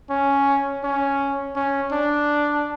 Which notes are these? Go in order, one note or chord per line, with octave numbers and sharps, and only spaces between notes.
C#4
C#4
C#4
D4